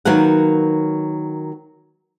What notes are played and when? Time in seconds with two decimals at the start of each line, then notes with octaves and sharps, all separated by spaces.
0.05 D#3 F#3 A#3 B4 F#5